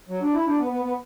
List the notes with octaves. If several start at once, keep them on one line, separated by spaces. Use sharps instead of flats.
F#3
D4
E4
D4
B3
B3
B3